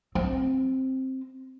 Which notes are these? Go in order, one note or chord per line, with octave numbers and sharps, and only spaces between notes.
C4